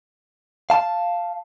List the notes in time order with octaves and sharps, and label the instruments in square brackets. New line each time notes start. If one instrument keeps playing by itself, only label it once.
[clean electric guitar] F5 A5